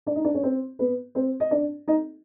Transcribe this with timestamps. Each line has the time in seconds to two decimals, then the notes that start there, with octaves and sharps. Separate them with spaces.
0.06 D4 D5
0.15 D#4 D#5
0.25 D4 D5
0.34 C#4 C#5
0.43 C4 C5
0.79 B3 B4
1.15 C4 C5
1.40 D#5
1.51 D4 D5
1.88 D#4 D#5